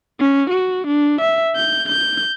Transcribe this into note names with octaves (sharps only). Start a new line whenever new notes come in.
C#4
F#4
D4
E5
G6
G6